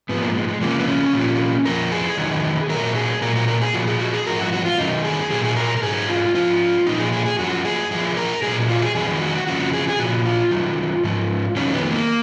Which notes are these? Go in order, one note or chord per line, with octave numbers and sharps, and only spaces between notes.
G#2 F3 B3
A#3
G#3
G#3
F2 C#3 F3 A#3
B3
C#4
A#2 F3
F2 F3 A#4
G#4
F2 D#3 F#3
A#2 F#3 A#4
G#4
A#2 F#3 A#4
A#4
A#4
G#4
A#2 F3 F#4
G#4
F#4
G#4
G#2 F3 A#4
F#4
F#4
F4
F#2 D#3 F#3 D#4
G#4
A#2 F#3 G#4
G#4
A#4
A#4
G#2 F#3 G#4
F4
G#2 F3 F4
A#2 F3 D#4
G#4
G#4
G#4
F#2 F3 F#4
G#4
F#2 F3 G#4
A#4
A#2 F#3 G#4
F4
G#4
F2 D#3 F#3 G#4
F#4
F2 C#3 F3 F#4
G#4
G#4
A#2 F3 F#4
F4
F#2 D#3 F#3
G#2 F3
F2 D#3 F#3 C#4
B3
B3
A#3